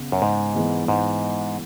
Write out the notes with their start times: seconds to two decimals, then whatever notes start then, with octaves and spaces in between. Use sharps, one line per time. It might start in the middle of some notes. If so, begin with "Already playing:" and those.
Already playing: C#3 B3
0.12 F#2
0.22 G#2
0.55 E3 G#3 B3 E4
0.88 G#2